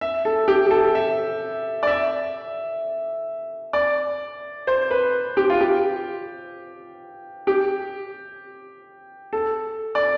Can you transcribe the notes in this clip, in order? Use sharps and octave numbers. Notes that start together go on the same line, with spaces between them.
E5
A4
G4
G4
A4
E5
D5
E5
D5
C5
B4
G4
F4
G4
G4
A4
D5